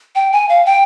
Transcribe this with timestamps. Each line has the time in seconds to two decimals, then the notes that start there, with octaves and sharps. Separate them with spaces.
0.15 G5
0.32 G#5
0.49 F5
0.66 G5